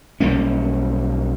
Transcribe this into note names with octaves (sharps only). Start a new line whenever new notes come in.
B1 G3 A#3 C#4